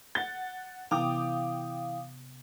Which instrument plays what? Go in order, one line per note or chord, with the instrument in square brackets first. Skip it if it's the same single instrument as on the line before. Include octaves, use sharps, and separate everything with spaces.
[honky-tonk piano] F#5 A6 [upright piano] G7
[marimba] C3 B3 [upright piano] E3 [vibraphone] F5 [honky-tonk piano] G5 D6 D#6